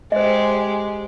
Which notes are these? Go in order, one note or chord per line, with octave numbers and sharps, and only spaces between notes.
G#3 G4 C5 D#5